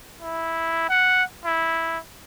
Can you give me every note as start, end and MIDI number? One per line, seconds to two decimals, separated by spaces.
0.22 0.85 64
0.89 1.23 78
1.45 1.98 64